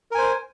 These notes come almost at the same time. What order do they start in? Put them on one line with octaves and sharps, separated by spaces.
A#4 G#5 C5